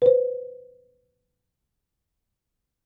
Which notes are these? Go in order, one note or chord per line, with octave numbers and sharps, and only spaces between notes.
B4 C5